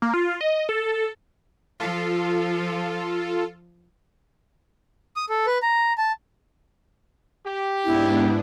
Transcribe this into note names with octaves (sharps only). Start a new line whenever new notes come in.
A#3
F4
D#5
A4
F3 F4 A4
D#6
A4
B4
A#5
A5
G4
G#2 B3 D4 E4